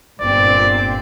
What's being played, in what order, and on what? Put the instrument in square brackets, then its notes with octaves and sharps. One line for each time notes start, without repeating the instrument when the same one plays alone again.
[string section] G1 A#2 C4 [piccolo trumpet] D5